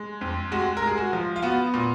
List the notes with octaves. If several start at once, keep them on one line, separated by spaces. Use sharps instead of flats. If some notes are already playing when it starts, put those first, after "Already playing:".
Already playing: G#3
F2
G#3 F#4
A#4
G#3
G#4
F#4
F3
F4
B3 F#4
A#2